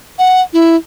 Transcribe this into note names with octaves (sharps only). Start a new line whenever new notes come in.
F#5
E4